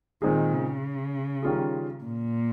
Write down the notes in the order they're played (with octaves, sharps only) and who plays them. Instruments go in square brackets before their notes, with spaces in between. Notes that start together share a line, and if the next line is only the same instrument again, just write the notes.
[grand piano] A#2 G#3 C4 D#4 G#4 [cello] D#3
[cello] C#3
[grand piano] D#3 G3 C#4 F4 G#4
[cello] A#2